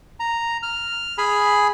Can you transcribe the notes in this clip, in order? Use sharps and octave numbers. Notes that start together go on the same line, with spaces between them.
A#5
F6
G#4 G#5 B5